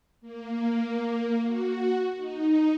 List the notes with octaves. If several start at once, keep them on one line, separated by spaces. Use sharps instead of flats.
A#3
F#4
D#4